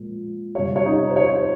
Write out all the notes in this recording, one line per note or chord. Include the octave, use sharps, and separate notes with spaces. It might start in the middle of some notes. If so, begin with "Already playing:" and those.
Already playing: A#2 F3 G#3
C3 G3 C#5
C#5
D#4 D#5
C5
C#5